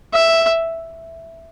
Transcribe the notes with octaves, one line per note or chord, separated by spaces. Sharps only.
E5